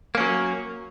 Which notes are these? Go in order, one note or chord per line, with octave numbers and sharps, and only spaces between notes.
F#3 A#3 C#4